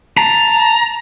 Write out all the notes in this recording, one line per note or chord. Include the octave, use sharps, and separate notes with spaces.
A5 A#5